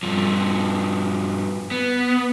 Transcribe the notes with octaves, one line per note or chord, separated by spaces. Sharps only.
G2 F3
B3